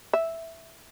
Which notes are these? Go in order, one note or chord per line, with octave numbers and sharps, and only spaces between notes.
E5